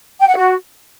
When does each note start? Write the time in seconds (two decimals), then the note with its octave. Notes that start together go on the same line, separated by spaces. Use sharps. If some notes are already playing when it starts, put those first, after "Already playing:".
0.19 G5
0.27 F#5
0.35 F#4